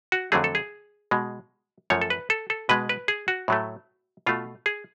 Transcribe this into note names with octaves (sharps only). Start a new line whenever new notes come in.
F#4
F2 D3 F#3 A3 G#4
A4
G#4
B2 G#3
F#2 F3 A3 C#5
A4
B4
A4
A4
B2 G#3 B4
B4
G#4
F#4
A2 F#3 A3
B2 A3 F4
G#4